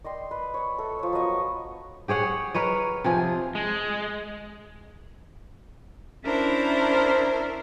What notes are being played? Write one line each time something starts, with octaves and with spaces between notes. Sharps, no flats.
D5 D#5 G5 C6
B4
C#5 D#6
A4 E5
F3 C#5
F#3 B3 D#5 C#6
G4 G#4 C#5 F#5
A#4 B4 C#5 D#5
C3 F3 G#4
G#3
C#4 D4 E4 A#4 C5 E5